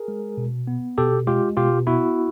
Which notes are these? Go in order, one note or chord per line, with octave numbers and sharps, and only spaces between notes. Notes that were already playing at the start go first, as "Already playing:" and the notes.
Already playing: G#4 A#4
G#3
B2
B3
B2 G4 A4
G#3 F4 G4
B2 F4 G4
B3 E4 F#4